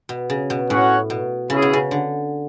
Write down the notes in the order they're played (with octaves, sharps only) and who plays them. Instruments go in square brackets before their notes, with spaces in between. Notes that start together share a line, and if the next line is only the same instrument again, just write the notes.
[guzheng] B2
C#3
B2
[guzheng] A2 [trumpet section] C#4 F#4 C#5 F#5
[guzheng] B2
[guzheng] C#3 [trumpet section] C#4 E4 G#4
[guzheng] B2
C#3
D3